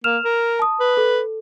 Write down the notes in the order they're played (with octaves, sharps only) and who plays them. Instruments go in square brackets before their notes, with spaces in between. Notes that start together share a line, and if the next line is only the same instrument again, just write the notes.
[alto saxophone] A#3 [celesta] F6 E7 F7
[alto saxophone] A#4
[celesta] A5 D#6
[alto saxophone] B4
[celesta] A4